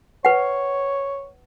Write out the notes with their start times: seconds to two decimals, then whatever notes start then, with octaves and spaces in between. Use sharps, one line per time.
0.25 B4 C#5 F#5